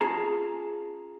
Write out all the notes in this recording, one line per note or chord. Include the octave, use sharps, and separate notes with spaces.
C#4 F4 G#4 A5 A#5